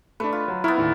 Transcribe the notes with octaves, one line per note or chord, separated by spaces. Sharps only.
A3 D4 B4
F4
F#3
B3 E4 A#4 C#6
D#2 A2 D3